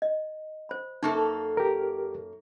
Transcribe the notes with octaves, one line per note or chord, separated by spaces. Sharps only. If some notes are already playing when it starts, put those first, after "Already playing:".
D#5
C5 B5
F#2 A#3 D#4 A4 C#6
G4 A#4